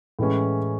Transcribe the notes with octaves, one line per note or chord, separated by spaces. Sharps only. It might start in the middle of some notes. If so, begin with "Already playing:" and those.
A2 E3 G#3 C#4